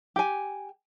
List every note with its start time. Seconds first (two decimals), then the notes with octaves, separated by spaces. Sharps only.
0.16 G4 G#5